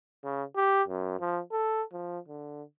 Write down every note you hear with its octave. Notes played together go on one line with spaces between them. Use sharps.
C#3
G4
F#2
F3
A4
F3
D3